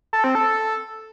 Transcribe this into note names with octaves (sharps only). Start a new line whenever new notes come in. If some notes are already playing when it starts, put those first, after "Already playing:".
A4
C4
A4